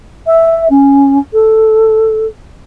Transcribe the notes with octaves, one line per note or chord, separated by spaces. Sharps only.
E5
C#4
A4